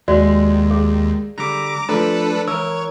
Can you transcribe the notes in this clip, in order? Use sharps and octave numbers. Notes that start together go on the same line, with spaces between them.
D#2 G#3 F#4 D5
G#4
D3 G3 A#5 D6
F3 A3 D4 A4 B4 A#5
E3 A#4 C#5 E6